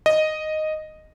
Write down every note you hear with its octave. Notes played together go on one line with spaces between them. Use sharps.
D#5